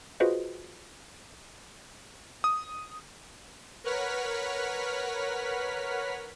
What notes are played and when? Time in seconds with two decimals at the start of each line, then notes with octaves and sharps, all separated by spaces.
0.20 F4 F#4 G#4 B4 C5 D#5
2.44 D#6
3.84 A#4 B4 C#5 F#5 F6 B6